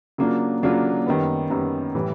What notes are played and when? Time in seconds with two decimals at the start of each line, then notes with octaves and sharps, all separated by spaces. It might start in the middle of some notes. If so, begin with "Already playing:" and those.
0.18 C#3 F#3 A#3 D4 F4
0.63 C#3 F#3 A#3 D4 F4
1.06 F#2 D#3 G3 B3
1.50 F#2 D#3 G3 B3
1.95 A2 E3 G3